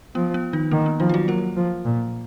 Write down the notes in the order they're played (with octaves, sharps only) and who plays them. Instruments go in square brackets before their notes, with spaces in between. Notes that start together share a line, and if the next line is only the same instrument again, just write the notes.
[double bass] F3 [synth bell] B3
[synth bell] B3
D#3 D#4
[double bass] D#3 [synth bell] A#3
[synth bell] B3
[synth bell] D#3 D#4 [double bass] F3
[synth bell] F4
F#3 F#4
[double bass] F#3 [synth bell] A#3 A#4
[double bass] F3
A#2